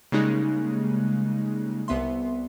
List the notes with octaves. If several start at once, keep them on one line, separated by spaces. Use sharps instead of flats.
C#3 G3 G#3 A#3 D#4 F#6
C2 B3 E5 C6